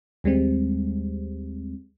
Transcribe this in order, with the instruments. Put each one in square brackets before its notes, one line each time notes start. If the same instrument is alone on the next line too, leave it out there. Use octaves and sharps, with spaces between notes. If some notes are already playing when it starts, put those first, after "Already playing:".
[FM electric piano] D#2 G3 G#3 C4